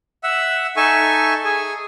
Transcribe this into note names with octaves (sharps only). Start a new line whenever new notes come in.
E5 F#5 E6
D#4 A4 E5 G#5 A5 C#6
G#4 G#5